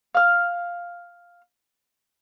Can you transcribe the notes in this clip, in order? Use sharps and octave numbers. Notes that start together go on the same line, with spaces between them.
F5 F6